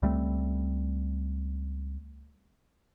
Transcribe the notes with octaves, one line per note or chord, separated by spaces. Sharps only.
C#2 G3 A3 C4